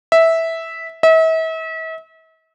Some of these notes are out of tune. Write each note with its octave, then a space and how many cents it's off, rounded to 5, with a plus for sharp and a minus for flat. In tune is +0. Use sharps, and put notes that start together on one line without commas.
E5 -10
E5 -40